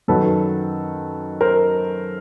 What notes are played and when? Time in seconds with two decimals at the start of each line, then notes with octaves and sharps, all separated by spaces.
0.08 F#2 D#3 F#3 A4 B4
1.41 A#4 C5